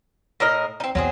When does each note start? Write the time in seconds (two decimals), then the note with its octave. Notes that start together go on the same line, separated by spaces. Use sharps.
0.40 A2 A#4 D#5
0.80 C4 D#4
0.95 E2 F#3 C4 G#4